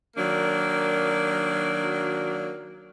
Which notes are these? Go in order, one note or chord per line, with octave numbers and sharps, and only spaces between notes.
D#3 F#3 A#3 D4